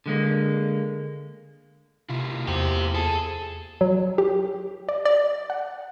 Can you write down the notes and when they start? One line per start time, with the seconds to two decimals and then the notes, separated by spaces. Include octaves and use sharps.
0.06 D3 G#3 A#3
2.09 C3 A#3 E4 F4
2.47 E2 G4 C5
2.95 G#4 A4
3.81 F#3
4.18 G4
4.89 D5
5.05 D5
5.50 F#5